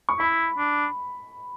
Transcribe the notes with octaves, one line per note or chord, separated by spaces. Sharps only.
C#6
E4 B5
D4